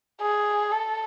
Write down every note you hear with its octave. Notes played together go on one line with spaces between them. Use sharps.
G#4
A4